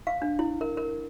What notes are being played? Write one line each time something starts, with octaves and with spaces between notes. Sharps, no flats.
F5
D4
E4
A#4
A#4